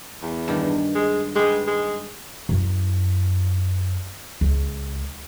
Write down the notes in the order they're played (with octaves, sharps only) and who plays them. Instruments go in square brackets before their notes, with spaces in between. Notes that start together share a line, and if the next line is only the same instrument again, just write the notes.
[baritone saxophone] E2
[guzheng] G2 D#3
[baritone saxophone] G#3
[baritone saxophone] G#3 [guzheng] G4 B4
[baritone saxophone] G#3
[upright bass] F#2 E4
C#2